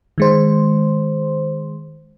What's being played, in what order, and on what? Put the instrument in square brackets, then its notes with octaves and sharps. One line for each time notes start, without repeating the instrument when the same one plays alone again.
[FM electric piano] D#3 G#3 C5